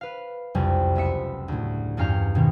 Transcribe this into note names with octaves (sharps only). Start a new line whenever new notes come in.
B4 F5
F#1 C2 F2 G3 G#5
C#2 B3 E5 C#7
D2 A2
E2 G2 C#4 F5 A#5 G6
B2 D#3 C4 C#4